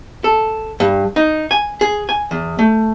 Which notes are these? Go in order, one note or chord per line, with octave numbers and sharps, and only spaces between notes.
A4
G2
D#4
G#5
G#4
G#5
E2
A3